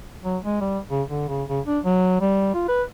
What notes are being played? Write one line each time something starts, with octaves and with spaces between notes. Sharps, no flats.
F#3
G#3
G3
C#3
D3
C#3
C#3
D4
F#3
G3
F4
B4